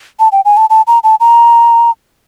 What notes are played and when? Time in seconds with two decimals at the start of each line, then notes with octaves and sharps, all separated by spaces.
0.20 A5
0.32 G5
0.45 G#5
0.57 A5
0.70 A5
0.87 A#5
1.04 A5
1.20 A#5